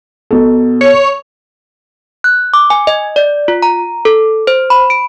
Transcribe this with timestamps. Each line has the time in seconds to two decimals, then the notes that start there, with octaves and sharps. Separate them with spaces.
0.31 B2 A4
0.81 C#5
2.24 F#6
2.54 D6
2.70 G#5
2.87 D#5
3.16 D5
3.48 F4
3.62 A#5
4.05 A4
4.47 C5
4.70 B5
4.90 D7